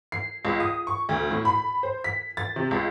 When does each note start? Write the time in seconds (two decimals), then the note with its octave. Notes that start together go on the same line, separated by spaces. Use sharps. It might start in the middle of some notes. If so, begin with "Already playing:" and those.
0.12 C7
0.45 C#2
0.60 D#6
0.87 C#6
1.09 D2
1.31 A2
1.45 B5
1.83 C5
2.04 B6
2.37 A6
2.56 C3
2.71 C#2